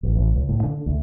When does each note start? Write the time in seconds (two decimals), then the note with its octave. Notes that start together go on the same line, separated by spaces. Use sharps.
0.03 A1
0.15 A1
0.35 C#2
0.49 A2
0.63 D3
0.86 D2